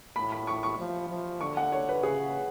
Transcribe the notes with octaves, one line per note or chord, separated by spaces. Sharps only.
A2 B5
B5
C#6
C#6
F3
F3
D3 C#6
F#5
C#5
B4
C#3 G#4